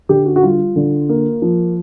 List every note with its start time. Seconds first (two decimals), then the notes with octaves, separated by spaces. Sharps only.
0.09 D3 G4
0.26 F#4
0.36 F#4
0.43 G3 F4
0.76 D3
1.09 A#3
1.42 F3